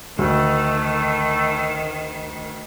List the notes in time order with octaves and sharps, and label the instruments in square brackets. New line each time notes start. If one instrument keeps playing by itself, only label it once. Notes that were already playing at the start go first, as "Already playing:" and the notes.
[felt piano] D2 [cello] D#3 [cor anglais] A3